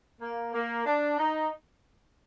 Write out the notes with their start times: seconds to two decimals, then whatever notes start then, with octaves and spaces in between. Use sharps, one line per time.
0.20 A#3
0.53 A#3
0.86 D4
1.19 D#4